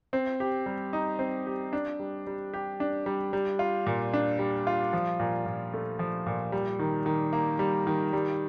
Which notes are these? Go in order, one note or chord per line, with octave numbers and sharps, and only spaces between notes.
C4
G4
G3
D#4
C4
G4
D4
G3
G3
G4
D4
G3
G3
F4
A#2
D4
G3
F4
F3
A#2
A#2
A3
F3
A#2
G3
D#3
D#3
A#3
G3
D#3
G3